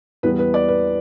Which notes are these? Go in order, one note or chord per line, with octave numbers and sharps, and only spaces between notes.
E2 E3 G3 B3 B4
B4
D5
B4